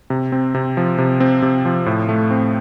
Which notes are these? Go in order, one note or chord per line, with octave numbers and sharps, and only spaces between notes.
C3
C4
C3
F3
C3
C4
C3
F3
A2
A3
C4